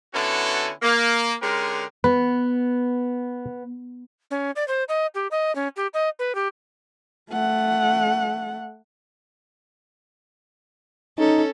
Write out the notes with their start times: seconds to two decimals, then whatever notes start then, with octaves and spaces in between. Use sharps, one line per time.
0.14 D3 B3 C#4 E4 F#4 A4
0.82 A#3
1.42 D3 G#3 C#4 G4 A#4
2.04 B3 B4
4.31 C#4
4.56 D5
4.68 C5
4.89 D#5
5.14 G4
5.31 D#5
5.55 C#4
5.76 G4
5.94 D#5
6.19 B4
6.35 G4
7.30 A3 F#5
11.18 C#4 D#4 A4